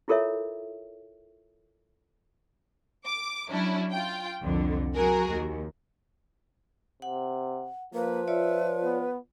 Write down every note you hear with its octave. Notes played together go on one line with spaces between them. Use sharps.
E4 F4 A4 A#4 C#5 E5
D6
F#3 C#4 D4 E4
F4 G5
C2 F2 D3
F#3 F#4 G#4 A#4
D#2
C3 F#5
F3 A#3 B4
F4 C#5 D5 E5
B3